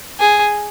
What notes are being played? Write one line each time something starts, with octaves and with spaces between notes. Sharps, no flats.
G#4